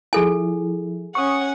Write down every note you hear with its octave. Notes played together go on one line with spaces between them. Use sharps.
F3 E4 G#4 A4 G#5
C#4 F#5 C#6 D#6